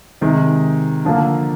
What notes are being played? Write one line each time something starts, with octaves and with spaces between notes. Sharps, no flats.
C3 D#3 G#3
D3 F3 A#3